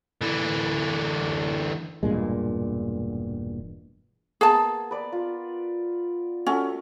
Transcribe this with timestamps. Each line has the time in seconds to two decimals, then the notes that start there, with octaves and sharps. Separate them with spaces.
0.22 D3 E3
2.03 E1 G2 A#2 G#3
4.41 A#3 B3 G#4 A5
4.91 B4 D5
5.12 F4
6.46 A3 C#4 F#4